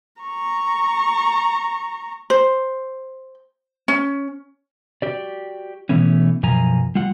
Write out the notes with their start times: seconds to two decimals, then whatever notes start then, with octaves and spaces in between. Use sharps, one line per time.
0.21 A#5 C#6
2.30 C5
3.88 C#4
5.02 F#4 G4 D5
5.89 B2 E3 A3 B3 C#4
6.43 F#2 B2 F3 G#5 A#5
6.95 G3 F4 F#5